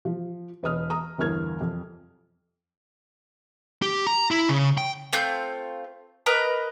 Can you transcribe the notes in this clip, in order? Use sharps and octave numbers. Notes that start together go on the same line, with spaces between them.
F3
E1 B4 D#5 D#6 F6
A#5 D#6
G1 E2 A#4 F6 G#6
F2
G4
A#5
E4
C#3
G5
A3 C4 F4 G6
A#4 B4 D#5 A#5